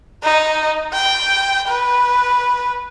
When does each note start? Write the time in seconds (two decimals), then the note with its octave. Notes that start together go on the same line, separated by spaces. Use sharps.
0.24 D#4
0.93 G5
1.68 B4